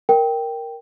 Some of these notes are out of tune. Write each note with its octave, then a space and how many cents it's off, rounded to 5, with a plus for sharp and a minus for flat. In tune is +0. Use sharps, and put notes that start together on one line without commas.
A#4 +0 G5 +0